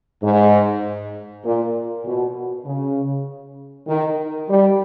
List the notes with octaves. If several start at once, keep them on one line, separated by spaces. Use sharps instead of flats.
G#2
A#2
B2
C#3
D#3
G3